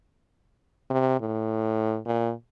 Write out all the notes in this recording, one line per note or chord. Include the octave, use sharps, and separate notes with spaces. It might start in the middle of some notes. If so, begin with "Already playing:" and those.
C3
A2
A#2